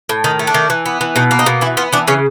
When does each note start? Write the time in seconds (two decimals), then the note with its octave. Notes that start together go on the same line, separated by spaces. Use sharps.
0.09 A2
0.24 D#3 D#4
0.39 A3
0.47 D4
0.54 D#3
0.70 E3
0.86 B3
1.01 E3
1.16 B2 D#4
1.31 A#3
1.39 D#4
1.46 B2
1.61 E3 E4
1.77 B3 F4
1.93 E3 D4
2.08 C#3 C#4